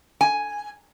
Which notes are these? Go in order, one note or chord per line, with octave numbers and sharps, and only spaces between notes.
G#5